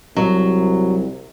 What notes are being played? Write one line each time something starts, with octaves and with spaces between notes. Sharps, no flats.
C2 F#3